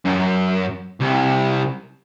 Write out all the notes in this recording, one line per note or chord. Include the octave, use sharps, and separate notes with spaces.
F#2
C2